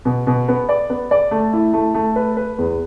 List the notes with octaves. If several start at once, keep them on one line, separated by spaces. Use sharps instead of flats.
B2
B2
B3
D5
B3
D5
A3
E4
A3
A3
B4
B4
E2